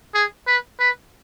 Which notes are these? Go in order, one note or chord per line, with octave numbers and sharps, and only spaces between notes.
G#4
B4
B4